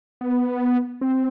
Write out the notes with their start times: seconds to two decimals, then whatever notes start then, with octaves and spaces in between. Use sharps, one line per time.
0.21 B3
1.01 C4